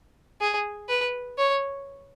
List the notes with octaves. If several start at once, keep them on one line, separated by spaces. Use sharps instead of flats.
G#4
B4
C#5